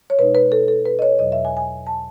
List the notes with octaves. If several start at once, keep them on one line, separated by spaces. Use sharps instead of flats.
C#5
B2 G#3 D#4 B4
B4
A4
A4
B4
D#5
C#5
E2 B2 F#3 D#5
E5
G#5
G#5
A5